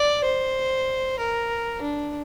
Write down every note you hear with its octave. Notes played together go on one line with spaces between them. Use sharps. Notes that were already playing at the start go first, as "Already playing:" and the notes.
Already playing: D5
C5
A#4
D4